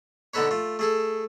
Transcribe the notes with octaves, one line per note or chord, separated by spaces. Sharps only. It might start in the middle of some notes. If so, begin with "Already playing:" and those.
D3 B3 D#4 A4 B4 C#5
A3 F4
A3 G#4 A4